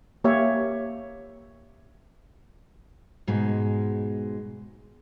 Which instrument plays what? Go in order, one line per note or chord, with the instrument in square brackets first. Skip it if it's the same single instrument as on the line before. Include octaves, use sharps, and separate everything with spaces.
[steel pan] A#3 G4 C#5 E5 F5
[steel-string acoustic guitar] G#2 B2 G#3